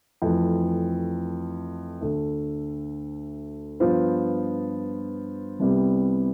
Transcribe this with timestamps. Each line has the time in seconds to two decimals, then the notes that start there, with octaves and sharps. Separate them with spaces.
0.22 F2 E3 A3
2.01 D2 D3 A3
3.80 G2 F3 B3 F4 C5
5.59 C2 C3 G3 B3